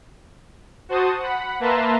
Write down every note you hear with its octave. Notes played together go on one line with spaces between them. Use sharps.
F#4 C5 A5 D#6
F#5 B5
A#3 B4 E5 A5 A#5 C6